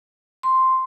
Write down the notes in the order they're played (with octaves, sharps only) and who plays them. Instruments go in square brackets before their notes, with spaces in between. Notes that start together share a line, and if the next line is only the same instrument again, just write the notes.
[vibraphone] C6